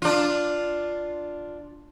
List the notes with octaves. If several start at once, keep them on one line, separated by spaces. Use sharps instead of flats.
D4 F4